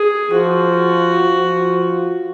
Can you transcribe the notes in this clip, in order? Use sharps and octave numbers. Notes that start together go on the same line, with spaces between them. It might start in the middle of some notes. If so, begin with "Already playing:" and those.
Already playing: G#4
F3 F#4
F3